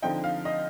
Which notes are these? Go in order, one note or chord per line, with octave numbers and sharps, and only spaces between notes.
D3 F3 C4 D#4 G5
F5
D#5